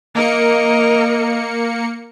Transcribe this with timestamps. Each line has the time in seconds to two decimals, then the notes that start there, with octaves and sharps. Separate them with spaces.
0.15 A#3 A#4 D#5 C#7